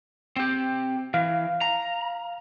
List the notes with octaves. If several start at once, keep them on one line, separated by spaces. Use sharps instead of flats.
C4 G4
E3 F5
A#5